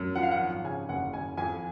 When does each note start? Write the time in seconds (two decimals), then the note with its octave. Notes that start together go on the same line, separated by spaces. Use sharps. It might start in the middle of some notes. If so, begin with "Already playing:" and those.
Already playing: F#2
0.15 F3 F#5
0.23 F5
0.31 F#5
0.40 G#1
0.64 C#3 G#5
0.89 F#1 F#5
1.13 F#1 G#5
1.37 F2 G#5